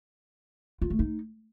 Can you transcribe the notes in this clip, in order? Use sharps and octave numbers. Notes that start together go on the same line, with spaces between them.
F4
A3
D#4